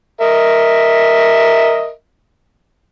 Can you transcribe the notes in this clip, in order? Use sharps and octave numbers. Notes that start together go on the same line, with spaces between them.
A#4 D#5 E5